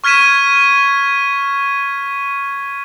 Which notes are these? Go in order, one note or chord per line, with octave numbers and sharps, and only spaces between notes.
C#6 F6 G#6 B6 D#7 E7